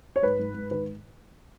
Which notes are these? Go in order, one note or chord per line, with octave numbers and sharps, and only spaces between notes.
C#5
G#2 B4
G#2
G#2
D#3 B4